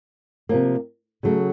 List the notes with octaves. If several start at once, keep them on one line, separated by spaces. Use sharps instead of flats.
C3 F3 A#3
C#3 F#3 A3